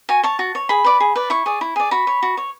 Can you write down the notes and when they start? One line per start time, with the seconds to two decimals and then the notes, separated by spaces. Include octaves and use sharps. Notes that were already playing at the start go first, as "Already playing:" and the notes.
0.09 F#4 G#5
0.23 C#5 A5
0.39 F#4
0.55 C#5
0.69 G#4 B5
0.84 B4 D5
1.00 G#4
1.16 B4 D5
1.30 E4 C#6
1.46 G#4 D5
1.61 E4
1.76 G#4 D5
1.91 F#4 B5
2.07 C#5
2.23 F#4
2.37 C#5